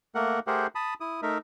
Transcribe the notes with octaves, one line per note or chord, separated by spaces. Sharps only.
A3 A#3 A#4 F#5
A3 G4 G#4 A#4 C5 F#5
A5 B5 D#6
E4 D#6
A3 D#4 A#4 E5